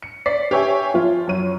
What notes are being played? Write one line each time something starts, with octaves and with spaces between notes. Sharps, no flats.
C#7
D5 B6 C7
G4 B4 C#5 E5 G5 G#5
F3 F4
F#2 C#5 D#7